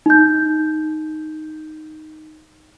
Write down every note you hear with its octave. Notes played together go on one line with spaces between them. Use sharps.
D#4 G6